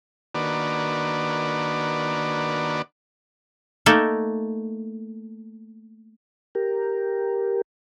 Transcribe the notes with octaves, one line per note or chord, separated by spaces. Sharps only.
D#3 A#3 D4 F#4 B4 D5
A3 A#3 D#4 A4
G4 A#4